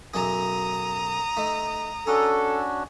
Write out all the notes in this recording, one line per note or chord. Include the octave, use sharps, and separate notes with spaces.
B1 F#2 G#4 A#5 D#6
A3 D#4
C#4 D4 F#4 G#4 A4